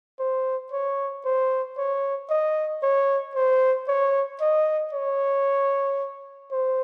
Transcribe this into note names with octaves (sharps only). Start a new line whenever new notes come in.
C5
C#5
C5
C#5
D#5
C#5
C5
C#5
D#5
C#5
C5